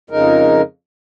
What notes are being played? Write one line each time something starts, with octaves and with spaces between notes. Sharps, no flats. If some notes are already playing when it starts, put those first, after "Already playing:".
F2 C#3 G#3 D#4 A#4